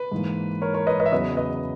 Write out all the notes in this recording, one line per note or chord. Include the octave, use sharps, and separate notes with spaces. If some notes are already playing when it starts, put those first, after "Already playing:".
Already playing: B4
G#2 E3 A#3
A#4 C#5
A#4 C#5
B4 D#5
B4 D#5
E5
E2 C#3 F#3 B3 B4 D#5
B4 D#5